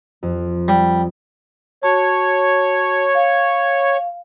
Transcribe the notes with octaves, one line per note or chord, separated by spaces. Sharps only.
F2
G3
F#4 C#5 A5
F5